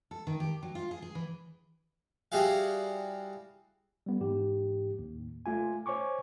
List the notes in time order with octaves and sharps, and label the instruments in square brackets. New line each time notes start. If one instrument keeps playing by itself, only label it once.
[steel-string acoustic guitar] A4
D#3
G4
F#3
F4
G#4
G#4
E3
[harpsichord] G3 E4 F#4 G#4 F5
[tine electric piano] G3 B3
G#2 E3 G4
D#2 A2
A3 F4 G#5
C5 C#5 G#5 C#6 D6